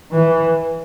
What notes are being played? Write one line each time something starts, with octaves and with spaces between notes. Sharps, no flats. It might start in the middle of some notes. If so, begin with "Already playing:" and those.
E3